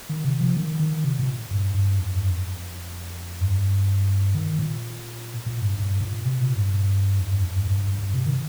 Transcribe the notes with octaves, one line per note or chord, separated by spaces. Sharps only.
D#3
C3
F3
D#3
D#3
C3
A#2
G2
G2
F2
G2
F2
G2
D#3
A#2
A#2
G2
G2
A#2
C3
A#2
G2
F2
G2
F2
G2
G2
G2
G2
C3
D#3